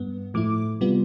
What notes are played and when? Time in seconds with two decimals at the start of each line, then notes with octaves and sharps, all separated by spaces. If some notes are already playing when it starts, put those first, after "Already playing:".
Already playing: G2 B3
0.34 A2 F3 A3 E4 D6
0.81 C3 G3 B3 F4